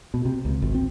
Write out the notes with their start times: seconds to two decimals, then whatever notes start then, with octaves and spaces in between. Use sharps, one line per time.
0.14 B2
0.25 C3
0.45 C#2
0.62 G#1
0.74 C4